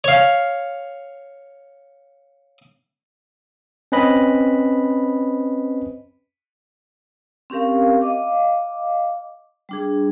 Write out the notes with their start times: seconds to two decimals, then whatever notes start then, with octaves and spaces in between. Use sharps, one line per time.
0.04 C#5 F5
3.92 C4 C#4 B4 D#5 B5
7.50 C4 C#4 G4 A#4 F5
8.01 D#5 F5 D6
9.69 G3 D4 G#4